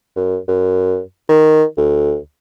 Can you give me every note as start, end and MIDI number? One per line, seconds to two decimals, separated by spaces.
0.16 0.37 42
0.48 1.00 42
1.29 1.64 51
1.77 2.16 38